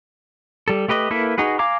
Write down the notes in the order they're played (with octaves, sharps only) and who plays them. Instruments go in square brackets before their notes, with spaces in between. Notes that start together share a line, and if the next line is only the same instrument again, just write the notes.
[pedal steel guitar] G3 A4
A3 G4 B4 D#5
A#3 E4 A4 B4
D#4 F#4 G#4 B4
F5 G#5 A#5 D6